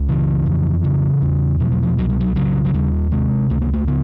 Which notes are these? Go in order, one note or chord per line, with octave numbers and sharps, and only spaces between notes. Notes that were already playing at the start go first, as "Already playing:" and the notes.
Already playing: C#2
C#3 E3
F2
C#3
E2
B2 F3
F#3
F3
C2 F#3
G3
F#3
C#3 F#3
F#3
D#2 G3
C3 G#3
C#2 A3
A#3
A3
C#3 B3